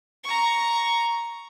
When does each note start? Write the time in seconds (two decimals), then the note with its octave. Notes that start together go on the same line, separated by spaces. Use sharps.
0.24 A#5 C#6